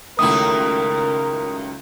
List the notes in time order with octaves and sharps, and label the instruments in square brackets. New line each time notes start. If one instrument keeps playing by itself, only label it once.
[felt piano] C#2 A3 [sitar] F#2 D#3 E4 [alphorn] A#4 [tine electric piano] D#6